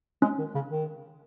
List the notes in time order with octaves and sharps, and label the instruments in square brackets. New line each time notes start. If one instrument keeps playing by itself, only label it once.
[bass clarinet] G#3 [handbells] C#4
[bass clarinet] D#3
C#3
D#3